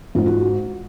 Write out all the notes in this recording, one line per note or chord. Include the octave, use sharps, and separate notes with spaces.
G#2 F4
F#4